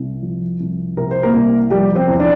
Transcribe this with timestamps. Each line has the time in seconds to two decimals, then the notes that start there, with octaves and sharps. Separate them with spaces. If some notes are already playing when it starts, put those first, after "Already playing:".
Already playing: C2 C3
0.22 F3
0.60 C2
0.97 C3 A#4
1.11 C5
1.23 A#3 A#4
1.33 C2
1.70 F3 G3 G4
1.95 C4 C5
2.08 E2
2.20 D4 D5